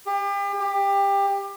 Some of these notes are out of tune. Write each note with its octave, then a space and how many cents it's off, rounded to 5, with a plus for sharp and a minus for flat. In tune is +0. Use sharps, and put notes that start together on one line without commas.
G4 +35
G4 +20